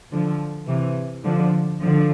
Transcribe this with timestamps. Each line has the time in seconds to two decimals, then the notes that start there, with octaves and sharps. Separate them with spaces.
0.12 D3 F3
0.68 C3 E3
1.24 D3 F3
1.80 D3 F3